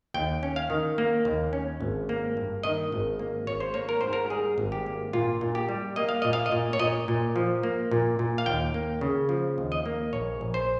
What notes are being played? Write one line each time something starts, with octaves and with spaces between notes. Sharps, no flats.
D#2 G5
C#4
F5
D#3
A#3
D#2
C#4
G#1
A#3
G2
D#3 D#5
G#1
A#3
G#1 C#5
C5
A#3 C#5
A#4
G#2 C5
A#4
G3 G#4
G#1
G4
A#3
A#2 F4
A#2
G4
G3
A#3 D#5
F5
A#2 D#5
F5
D#5
A#2
C#5
A#2 D#5
A#2
F3
A#3
A#2
A#2
F5
D#2 G5
A#3
C#3
F3
D#2
D#5
A#3
A#1 C#5
A#1
C5